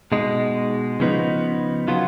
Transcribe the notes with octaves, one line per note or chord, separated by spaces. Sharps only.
B2 G#3 D#4
C#3 F3 B3 D#4
C#3 F#3 B3 F4